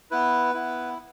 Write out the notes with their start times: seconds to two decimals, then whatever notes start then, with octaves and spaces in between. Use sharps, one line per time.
0.11 B3 E4 B4
0.54 B3 E4